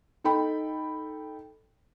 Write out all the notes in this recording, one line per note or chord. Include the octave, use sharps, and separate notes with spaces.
D#4 A4 G5 B5